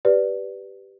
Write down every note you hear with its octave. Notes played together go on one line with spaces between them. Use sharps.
G4 B4 D5